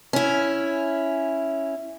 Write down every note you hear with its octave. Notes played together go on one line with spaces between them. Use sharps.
C#4 E4